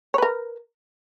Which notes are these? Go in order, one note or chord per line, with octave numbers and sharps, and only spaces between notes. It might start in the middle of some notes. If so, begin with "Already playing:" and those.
A#4 B4 C#5